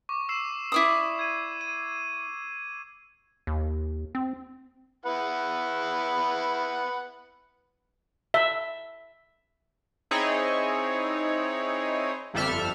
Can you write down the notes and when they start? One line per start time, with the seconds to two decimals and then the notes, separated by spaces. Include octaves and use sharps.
0.09 C#6 D6
0.29 E6 C7 E7
0.72 E4 D5 D#6
1.19 G#6 D#7
1.61 D#7
3.47 D#2
4.15 C4
5.05 E4 B4 F#5
8.34 E5
10.11 C4 D#4 E4 G#4 C#5
12.34 G1 F2 G3 A4 E5 F6